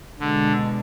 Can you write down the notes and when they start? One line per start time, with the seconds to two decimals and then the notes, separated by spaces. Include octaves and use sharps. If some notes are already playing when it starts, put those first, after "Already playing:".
0.20 B2 D3 G#3 D4